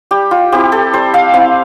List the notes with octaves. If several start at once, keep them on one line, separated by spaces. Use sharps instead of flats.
G3 G4
F4
C4 E4 G4
A4
G3 C5
F5
C4 E4 F5